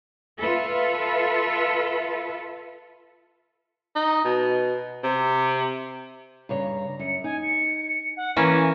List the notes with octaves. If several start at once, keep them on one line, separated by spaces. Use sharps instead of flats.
F4 A4 B4 E5
D#4
B2
C3
G2 C#3 C#5 A#5
F#2 C#7
D#4 G#5
C#7
F#5
E3 A#3 C#4 E4 G#5